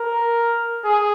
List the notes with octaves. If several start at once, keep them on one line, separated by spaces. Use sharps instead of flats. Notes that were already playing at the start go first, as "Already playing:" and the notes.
Already playing: A#4
G#4